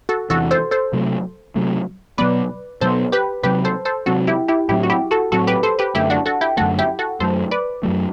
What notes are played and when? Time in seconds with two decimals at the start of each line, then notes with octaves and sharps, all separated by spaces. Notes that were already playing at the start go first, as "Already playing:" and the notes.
0.09 F#4 A4
0.30 E2 C3 E3 F#4 A4
0.51 A4 C5
0.71 A4 C5
0.93 C3 F#3 A3
1.56 C3 F#3 A3
2.18 B2 F#3 B3 B4 D5
2.81 B2 F#3 B3 A4 C5
3.12 G4 B4
3.43 C3 F#3 C4 G4 B4
3.65 A4 C5
3.85 A4 C5
4.06 C3 F#3 C4 F#4 A4
4.27 E4 G4
4.48 E4 G4
4.69 A2 F#3 C4 E4 G4
4.83 F#4
4.90 E4 G4
5.11 F#4 A4
5.32 A2 F#3 C4 F#4 A4
5.47 G4 B4
5.63 A4 C5
5.79 G4 B4
5.95 F#2 D3 A3 E4 G4
6.10 D4 F#4
6.26 F#4 A4
6.41 E4 G4
6.57 F#2 D3 A3 F#4 A4
6.79 E4 G4
6.99 F#4 A4
7.20 F#2 F#3 A3 A4 C5
7.51 B4 D5
7.83 F#2 F#3 A3